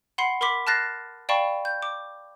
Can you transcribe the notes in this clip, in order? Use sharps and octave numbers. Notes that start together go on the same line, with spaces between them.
F#5 B5 C6 C7
A#4 B5 C6 D6 B6
A5 F6 F#6 A6 A#6 C7
D5 F5 G5 A5 B5 C#6
G6
D6